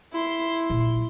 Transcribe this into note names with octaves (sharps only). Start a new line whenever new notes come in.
E4 C6
A#1